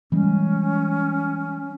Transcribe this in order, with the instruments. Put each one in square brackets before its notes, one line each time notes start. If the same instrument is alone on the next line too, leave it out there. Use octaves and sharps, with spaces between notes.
[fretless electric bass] E3 G3 G#3 [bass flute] C#4